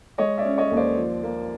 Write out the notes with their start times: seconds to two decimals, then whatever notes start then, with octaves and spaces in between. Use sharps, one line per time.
0.18 G#3 C#5 D#5
0.38 D5 E5
0.45 C#4
0.58 C#5 D#5
0.71 D#2
0.77 C5 D5
0.97 F3
1.23 A#3